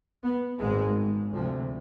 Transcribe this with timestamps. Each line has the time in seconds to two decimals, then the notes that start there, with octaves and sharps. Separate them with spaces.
0.23 B3
0.59 G#1 G#2 G#3
1.33 D2 C3 F3